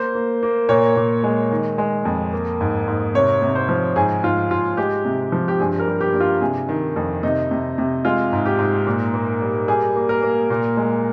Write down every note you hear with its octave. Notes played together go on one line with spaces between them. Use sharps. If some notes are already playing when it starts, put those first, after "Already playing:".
Already playing: A#3 C5
A#3
A#3
A#2 C#5
A#2
G#3
D#3
G#3
F2
A#3
G#2
G#2
C3 C#5
C3
C5
F3
G#2 G#4
G#2 F4
G#2 F4
G#3 G4
C3
F3
G4
G2 G#4
A#4
G3
G4
G2
F4
C3 G#4
D#3
F2
C3 D#4
C3
C3
G#3 F4
G#2
G4
G#2
A#2
A#3
G3
G3 G#4
A#3
A#4
A#3
A#2
G#3